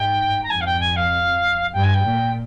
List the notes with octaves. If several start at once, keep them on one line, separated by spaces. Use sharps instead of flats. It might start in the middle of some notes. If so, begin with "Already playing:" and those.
Already playing: G#2 G5
A#5
F2 G#5
F5
G5
G#5
F5
G2 G5
G#5
G5
A#2